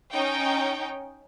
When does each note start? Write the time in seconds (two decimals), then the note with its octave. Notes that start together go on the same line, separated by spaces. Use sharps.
0.11 C#4 D#4 G5